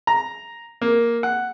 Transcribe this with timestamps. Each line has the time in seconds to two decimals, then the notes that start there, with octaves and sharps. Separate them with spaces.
0.07 A#5
0.82 A#3
1.23 F#5